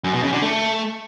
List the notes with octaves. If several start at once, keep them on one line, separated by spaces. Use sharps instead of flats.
F#2
B2
C#3
D3
A3